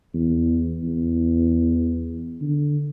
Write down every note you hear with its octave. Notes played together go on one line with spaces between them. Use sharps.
E2
E2
D3